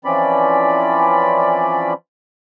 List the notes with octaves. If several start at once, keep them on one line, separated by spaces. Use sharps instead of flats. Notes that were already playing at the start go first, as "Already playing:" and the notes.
E3 F3 C4 C#4 D5 B5